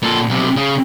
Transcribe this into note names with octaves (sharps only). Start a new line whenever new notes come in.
A#2 A4
B1 C3
C#3